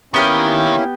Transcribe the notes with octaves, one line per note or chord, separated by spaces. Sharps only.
D#3 A#3 B3 C#4 E4 G4 F6